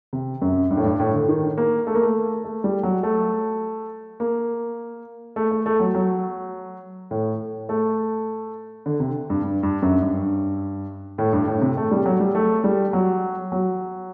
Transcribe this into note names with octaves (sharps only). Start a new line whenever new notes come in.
C3
F#2
G2
A2
G2
A2
D3
D#3
A#3
A3
A#3
A3
A3
G3
F#3
A3
A#3
A3
A3
A3
F#3
F#3
A2
A3
D3
C3
G2
G2
G2
F#2
G2
A2
G2
A2
C3
A3
G3
F#3
G3
A3
G3
F#3
F#3